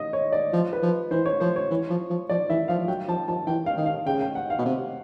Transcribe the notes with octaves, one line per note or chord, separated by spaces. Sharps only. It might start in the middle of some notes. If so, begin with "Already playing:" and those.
Already playing: D#5
C#5
D5
F3
B4
F3
E3 C5
C#5
F3 C5
C#5
E3
F3
F3
F3 D5
E3 E5
F3 F5
F3
F#3 G5
F3 A5
F3 A5
E3 G5
F5
D#3
F5
C#3 G5
G5
F#5
F5
B2
C3